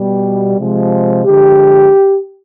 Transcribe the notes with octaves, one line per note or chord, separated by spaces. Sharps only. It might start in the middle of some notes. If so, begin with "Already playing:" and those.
Already playing: B2 G3
C3 F3 G#3
D3 F3 G#3 G4